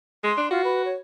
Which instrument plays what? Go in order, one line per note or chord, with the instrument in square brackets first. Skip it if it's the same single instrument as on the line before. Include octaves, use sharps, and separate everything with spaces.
[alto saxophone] G#3 [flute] C6
[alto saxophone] D4
[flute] F4 [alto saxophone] F#4
[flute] B4
C#5